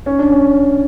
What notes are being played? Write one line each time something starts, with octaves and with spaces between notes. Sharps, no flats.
C#4
D4
C#4